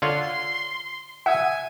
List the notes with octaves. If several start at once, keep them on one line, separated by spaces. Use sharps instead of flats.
D3 F4 C#5 C6
E5 F#5 G#5 D#6